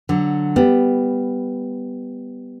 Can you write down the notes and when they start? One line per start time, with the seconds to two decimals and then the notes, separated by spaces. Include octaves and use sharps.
0.09 D3 F#3
0.56 G3 B3